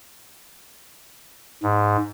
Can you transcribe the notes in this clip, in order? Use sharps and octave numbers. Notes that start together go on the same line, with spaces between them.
G#2